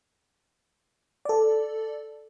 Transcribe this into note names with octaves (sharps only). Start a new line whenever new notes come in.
A4 D5